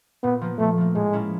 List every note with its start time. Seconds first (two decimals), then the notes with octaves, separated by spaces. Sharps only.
0.23 A#2 B3
0.41 F3 A#3
0.59 A#2 A3
0.78 F3 A#3
0.95 A2 G#3
1.13 F3 A#3 C#4 E4